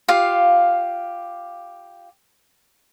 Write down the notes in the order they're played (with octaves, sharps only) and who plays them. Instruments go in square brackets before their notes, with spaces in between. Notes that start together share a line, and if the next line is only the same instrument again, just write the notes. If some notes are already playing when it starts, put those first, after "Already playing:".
[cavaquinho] F4 G4 F5